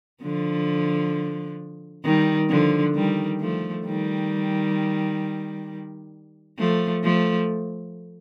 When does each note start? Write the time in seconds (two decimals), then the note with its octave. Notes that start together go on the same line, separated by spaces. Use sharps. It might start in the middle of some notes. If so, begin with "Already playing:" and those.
0.23 D3 F3
2.04 D#3 G3
2.50 D3 F3
2.95 D#3 G3
3.40 F3 A3
3.85 D#3 G3
6.59 F3 A3
7.03 F3 A3